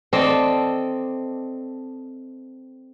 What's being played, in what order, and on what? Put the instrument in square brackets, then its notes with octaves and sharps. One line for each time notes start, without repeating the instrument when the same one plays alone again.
[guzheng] C4 A4 D5 D#5 A5